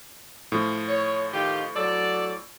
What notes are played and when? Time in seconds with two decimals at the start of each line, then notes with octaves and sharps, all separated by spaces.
0.52 A2 F3
0.88 C#5
1.34 D#3 F4 G4
1.76 F#3 A4 D5